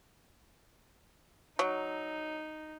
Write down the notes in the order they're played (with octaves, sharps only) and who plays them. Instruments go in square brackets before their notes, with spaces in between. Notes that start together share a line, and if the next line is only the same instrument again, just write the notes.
[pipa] F#3 [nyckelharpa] D#4